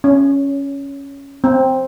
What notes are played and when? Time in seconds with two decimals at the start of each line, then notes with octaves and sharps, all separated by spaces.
0.04 C#4
1.44 C4